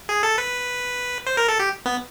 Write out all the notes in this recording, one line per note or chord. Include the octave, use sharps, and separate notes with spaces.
G#4
A4
B4
C5
A#4
A4
G4
B3